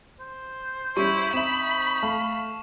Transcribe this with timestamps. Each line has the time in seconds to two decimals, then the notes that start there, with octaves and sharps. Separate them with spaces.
0.20 C5
0.97 G3 C#4 E4 C#6
1.33 C4 D#4 E5 B5 E7
2.03 A3 F5